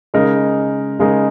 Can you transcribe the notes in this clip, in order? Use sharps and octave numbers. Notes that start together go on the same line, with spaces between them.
C#3 G#3 D#4 A#4
C#3 G#3 D#4 A#4